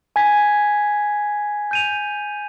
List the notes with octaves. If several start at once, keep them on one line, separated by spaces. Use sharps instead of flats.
G#5 G#6 B6
G6 D#7 F7